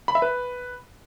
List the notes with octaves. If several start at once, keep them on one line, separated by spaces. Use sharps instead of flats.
B5
E5
B4